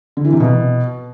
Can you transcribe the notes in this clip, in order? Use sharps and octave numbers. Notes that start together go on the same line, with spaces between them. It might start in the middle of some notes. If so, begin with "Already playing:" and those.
D3
E3
C3
B2